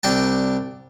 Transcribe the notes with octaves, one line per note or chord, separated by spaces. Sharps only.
C2 D4 G5 A5